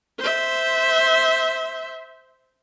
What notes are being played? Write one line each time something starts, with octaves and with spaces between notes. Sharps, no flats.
C5 E5